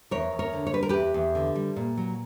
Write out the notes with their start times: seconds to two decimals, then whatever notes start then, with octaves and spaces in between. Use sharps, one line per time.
0.11 E2 A#4 C#5
0.32 E2
0.39 A#4 C#5
0.53 D3
0.67 C#5
0.73 G3 B4
0.83 A#4
0.89 E2 G4 B4
1.14 E2
1.35 D3
1.55 G3
1.76 A#2
1.97 F#3